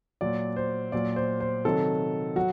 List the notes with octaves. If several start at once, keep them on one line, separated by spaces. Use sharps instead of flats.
A#2 F#3 D5
C5
A#2 F#3 D5
C5
C5
C3 D#3 F#3 A4
F#3 F#4